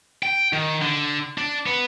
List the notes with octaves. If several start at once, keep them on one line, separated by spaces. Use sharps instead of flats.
G5
D#3
D3
D4
B3